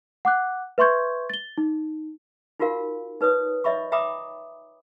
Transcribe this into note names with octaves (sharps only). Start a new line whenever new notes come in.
F#5 D6 F#6
B4 E5 C6 C#6 G6 G#6
A6 G7
D#4
D#4 F4 F#4 A#4 F5
D#4 B4 C#5 D#6
C#5 D#5 E5 B5 C#6
E5 G5 A#5 B5 D6 D#6